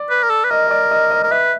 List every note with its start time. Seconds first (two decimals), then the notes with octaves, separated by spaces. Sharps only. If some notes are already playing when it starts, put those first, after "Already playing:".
Already playing: D5
0.10 B4
0.23 A#4
0.30 A4
0.44 B4
0.51 A#4 D#5
0.67 D#5
0.71 D5
0.91 D#5
1.11 D#5
1.23 A#4
1.31 B4 E5